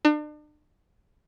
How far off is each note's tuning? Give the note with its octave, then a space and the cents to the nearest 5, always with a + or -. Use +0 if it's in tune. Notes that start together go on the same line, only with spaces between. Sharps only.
D4 +40